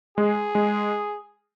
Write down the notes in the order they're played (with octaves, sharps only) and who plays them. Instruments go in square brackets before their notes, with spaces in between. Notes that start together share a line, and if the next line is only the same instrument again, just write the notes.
[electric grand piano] G#3 [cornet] G#4
[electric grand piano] G#3